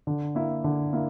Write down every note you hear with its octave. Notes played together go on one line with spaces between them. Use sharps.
D3
A#3 E4
D3
A#3 E4